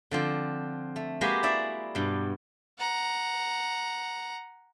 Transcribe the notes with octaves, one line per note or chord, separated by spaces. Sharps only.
D3 F3 C4
A3
G#3 A#3 F#4 G4 B4 G#5
E4 G#4 D5 E5
G2 B2
F#5 A#5